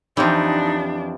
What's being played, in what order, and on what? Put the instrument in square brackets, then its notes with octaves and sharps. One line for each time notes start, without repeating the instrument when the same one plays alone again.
[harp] F2 G4 G5 [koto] E3 F3 [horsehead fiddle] D4 [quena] D#4